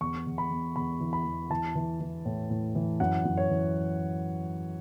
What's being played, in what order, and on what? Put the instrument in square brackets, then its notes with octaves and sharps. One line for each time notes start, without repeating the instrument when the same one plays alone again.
[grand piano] E2 C#6
E2
B5
E2
E2 B5
E3
B5
E2
E3 A5
E3
E3
A2
A2
E3
F#2 F#5
F#2
C#5
E3